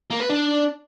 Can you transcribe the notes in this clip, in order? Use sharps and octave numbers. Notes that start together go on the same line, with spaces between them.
A#3
B4
D4